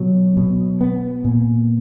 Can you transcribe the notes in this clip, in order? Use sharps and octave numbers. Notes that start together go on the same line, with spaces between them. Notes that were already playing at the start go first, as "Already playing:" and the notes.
Already playing: B2 F#3
B2
B3
A#2